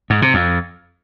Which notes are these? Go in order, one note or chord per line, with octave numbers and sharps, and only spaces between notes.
G#2
C3
F2